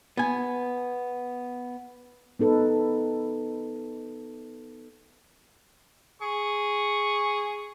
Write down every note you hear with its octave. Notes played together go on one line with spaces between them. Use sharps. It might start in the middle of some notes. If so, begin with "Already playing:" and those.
B3 G#5
B3 D#4 A4 B4
G#4 C#6